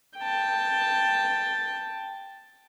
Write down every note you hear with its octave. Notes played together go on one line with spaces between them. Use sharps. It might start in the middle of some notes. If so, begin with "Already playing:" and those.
G5 A5